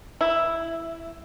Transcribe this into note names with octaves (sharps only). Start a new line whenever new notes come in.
E4